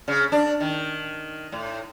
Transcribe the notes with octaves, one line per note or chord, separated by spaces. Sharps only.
C#3
D4
D#3
A2